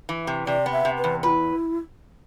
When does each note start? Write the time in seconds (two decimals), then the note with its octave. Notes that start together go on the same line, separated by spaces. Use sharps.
0.09 E3
0.27 C3
0.47 C3 D5
0.66 B3
0.72 E5
0.85 C3
0.98 B4
1.04 E2
1.23 F4 B4
1.28 E4